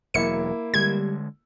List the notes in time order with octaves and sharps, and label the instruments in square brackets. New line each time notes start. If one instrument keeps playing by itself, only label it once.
[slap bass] E1 F#3 [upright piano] A#3 E4 [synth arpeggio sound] C#7
[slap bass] D3 G#3 [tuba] G3 [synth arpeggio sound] G#6